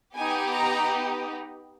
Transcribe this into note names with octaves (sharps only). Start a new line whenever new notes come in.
B3 D#4 G4 G#5
A#5